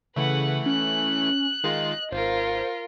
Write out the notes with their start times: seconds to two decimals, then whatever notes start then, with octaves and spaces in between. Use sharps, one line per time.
0.16 C#3 E3 A3 B4 F#5
0.66 C#4 F#6
1.64 D#3 G#3 F4 D#5
2.12 G#1 F4 A#4 C5